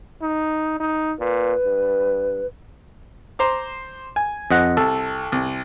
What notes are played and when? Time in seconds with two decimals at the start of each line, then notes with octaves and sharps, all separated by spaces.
0.22 D#4
0.80 D#4
1.19 A#2 B4
1.64 G2
3.39 C5 A#5 D6
4.16 G#5
4.51 F2 D#5 F#5
4.77 C2 A4
5.32 C2